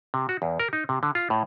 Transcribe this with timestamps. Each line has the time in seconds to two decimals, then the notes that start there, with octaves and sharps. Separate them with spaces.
0.14 C3
0.29 F#4
0.42 E2
0.60 A#4
0.73 D#4
0.89 C3
1.03 D3
1.15 F4
1.30 A2